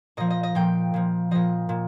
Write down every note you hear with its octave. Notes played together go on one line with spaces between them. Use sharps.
A#2 F3 D#5
D#5
D#5
A#2 F3 G5
A#2 F3
A#2 F3 D#5
A#2